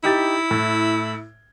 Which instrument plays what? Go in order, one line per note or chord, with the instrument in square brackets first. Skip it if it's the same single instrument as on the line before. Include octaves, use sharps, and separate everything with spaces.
[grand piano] D#4 G4 A6 [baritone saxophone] E4
[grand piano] A2